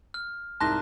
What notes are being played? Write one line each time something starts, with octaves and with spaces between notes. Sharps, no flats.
F6
C2 G#2 A5 C6 F#6 A#6